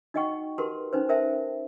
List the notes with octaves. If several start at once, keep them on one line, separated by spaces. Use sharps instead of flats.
D#4 F#4 D#5 F#5 G5 C#6
F#4 G4 A#4 B4 A5 C6
C#4 D#4 B4 C5
A#4 C5 E5 G5 A5